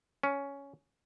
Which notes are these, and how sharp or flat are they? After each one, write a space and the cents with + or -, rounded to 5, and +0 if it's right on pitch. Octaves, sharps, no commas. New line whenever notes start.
C#4 +10